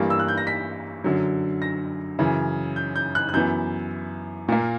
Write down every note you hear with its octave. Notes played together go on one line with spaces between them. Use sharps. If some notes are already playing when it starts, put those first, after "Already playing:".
Already playing: G2 E3 G3 A#3
E6
F#6
G6
A#6
B6
F#2 D3 F#3
A#6
F#2 C#3 E3
G6
G6
F#6
F#6
F#2 E3 B3 G6
A#2 A#3